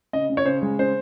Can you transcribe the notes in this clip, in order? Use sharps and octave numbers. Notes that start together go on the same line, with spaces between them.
C#3 D#5
C#3
C#5
C#3 C5
G#3
C#3 C5